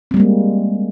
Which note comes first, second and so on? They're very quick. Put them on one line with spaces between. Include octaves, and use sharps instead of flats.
C4 G3 A#3 G#3